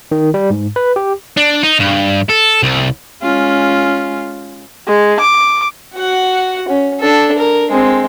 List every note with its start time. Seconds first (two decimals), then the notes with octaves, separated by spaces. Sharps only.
0.12 D#3
0.34 G3
0.50 G#2
0.76 B4
0.96 G4
1.37 D4
1.63 D#4
1.79 G2
2.30 A4
2.63 C2
3.22 G#3 C#4 F4
4.87 G#3
5.20 D6
5.96 F#4 F#5
6.68 C#4
7.00 D4 A4
7.38 A#4
7.70 G#3 C4